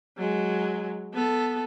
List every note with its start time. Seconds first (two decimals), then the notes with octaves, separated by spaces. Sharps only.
0.17 F#3 G#3
1.13 B3 A4